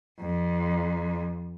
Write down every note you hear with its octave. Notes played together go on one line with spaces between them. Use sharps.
F2